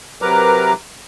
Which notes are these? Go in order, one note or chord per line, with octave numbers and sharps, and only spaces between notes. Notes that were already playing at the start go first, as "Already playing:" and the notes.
C3 F#3 A#4 B4 A#5 D6